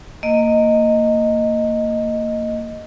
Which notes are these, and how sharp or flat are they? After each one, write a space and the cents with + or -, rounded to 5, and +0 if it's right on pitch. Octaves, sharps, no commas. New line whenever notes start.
A#3 -20 D#5 +0